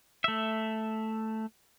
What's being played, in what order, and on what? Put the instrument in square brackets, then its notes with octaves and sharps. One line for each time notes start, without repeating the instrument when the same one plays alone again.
[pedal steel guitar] A3 E5